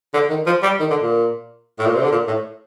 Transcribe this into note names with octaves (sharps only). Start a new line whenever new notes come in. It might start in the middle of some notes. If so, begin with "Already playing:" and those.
D3
D#3
F3
G3
D#3
D3
A#2
A2
A#2
C3
D3
A#2
A2